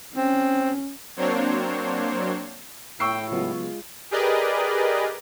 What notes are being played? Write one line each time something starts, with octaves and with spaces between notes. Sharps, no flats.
C4 C#4
F#3 A#3 C4 D4 C5 C#5
A2 G5 C#6 E6 C7
C#3 F#3 G#3 B3 F4
G4 G#4 A#4 B4 D5 D#5